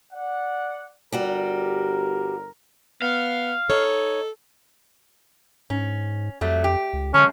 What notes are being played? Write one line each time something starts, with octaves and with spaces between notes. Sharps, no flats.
D5 F#5
G1 G3 F#4 G4 A#4 A#5
B3 F5
D#4 A4 C#5
G#2 C#4
F2 F#3 G3 A3
G4
C#2
F#2 D3 G#3 C#4 A5